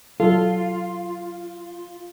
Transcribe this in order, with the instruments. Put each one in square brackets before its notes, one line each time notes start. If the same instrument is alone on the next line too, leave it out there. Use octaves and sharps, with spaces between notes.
[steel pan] F#3 A4 [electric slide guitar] F4